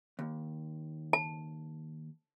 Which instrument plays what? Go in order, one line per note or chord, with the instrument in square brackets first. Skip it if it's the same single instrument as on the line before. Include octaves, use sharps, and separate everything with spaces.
[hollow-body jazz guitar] D#2
[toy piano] A5